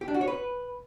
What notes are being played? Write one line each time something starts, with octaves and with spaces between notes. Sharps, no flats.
G4
D4
F#4
C#5
B4